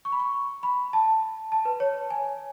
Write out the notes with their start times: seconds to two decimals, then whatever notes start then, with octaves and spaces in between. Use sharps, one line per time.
0.05 C#6
0.12 B5
0.20 C#6
0.63 B5
0.93 A5
1.52 A5
1.65 B4
1.80 C#5
2.10 G#5